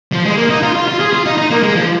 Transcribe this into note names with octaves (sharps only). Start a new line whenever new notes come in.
F3
G#3
A#3
D#4
F4
F4
F4
G#4
F4
D#4
D#4
A#3
G#3
F3